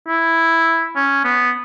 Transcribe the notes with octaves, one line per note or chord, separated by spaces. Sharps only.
E4
C#4
B3